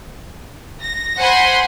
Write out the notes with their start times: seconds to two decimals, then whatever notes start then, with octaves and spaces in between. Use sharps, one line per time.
0.81 A#6
1.19 C5 F#5 G#5 B5 C6